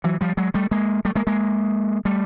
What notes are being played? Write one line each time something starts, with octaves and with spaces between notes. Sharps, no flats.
E3 F#3
F3 G3
F#3 G#3
G3 A3
G#3 A#3
G3 A3
G#3 A#3
G#3 A#3
G3 A3